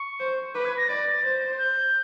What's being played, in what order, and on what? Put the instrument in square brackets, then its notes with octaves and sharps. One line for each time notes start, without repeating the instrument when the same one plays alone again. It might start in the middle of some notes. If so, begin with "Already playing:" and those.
Already playing: [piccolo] C#6
[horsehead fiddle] C5
[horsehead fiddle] B4 [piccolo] D6
[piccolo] G#6
A#6
[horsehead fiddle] D5 [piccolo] A6
[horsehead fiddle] C5
[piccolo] G6